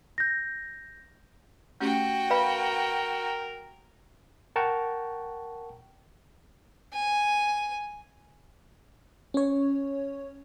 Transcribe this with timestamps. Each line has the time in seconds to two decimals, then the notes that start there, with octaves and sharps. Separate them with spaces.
0.18 G6 A#6
1.80 A3 C#4 F#4 G4 G5
2.30 A#4 B4 F5 B5
4.56 A#4 F#5 G5 A5 A#5 C#6
6.93 G#5
9.34 C#4 C#5